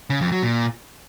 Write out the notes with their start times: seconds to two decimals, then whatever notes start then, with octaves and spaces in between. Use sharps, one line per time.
0.10 C#3
0.21 F2
0.32 F#3
0.43 A#2